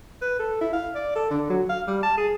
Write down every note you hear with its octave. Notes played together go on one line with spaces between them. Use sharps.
B4
A4
E4
F5
D5
A4
D3
F#3
F5
G3
A5
G#4